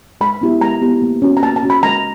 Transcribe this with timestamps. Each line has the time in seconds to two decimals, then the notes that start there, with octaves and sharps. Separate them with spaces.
0.21 G#3 B5
0.41 B3 E4 G4
0.61 G#3 A#5
0.82 B3 E4 G4
1.02 A#3
1.22 C#4 F#4
1.37 A#5
1.43 A#3 A5
1.56 A5
1.63 C#4 F#4
1.70 B5
1.83 G#3 A#5